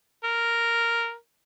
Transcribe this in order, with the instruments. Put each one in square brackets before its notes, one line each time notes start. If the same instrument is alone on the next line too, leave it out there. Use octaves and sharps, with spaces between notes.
[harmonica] A#4